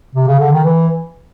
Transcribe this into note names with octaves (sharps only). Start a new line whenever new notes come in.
C3
C#3
D3
D#3
E3